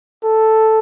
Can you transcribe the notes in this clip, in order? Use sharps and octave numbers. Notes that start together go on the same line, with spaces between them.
A4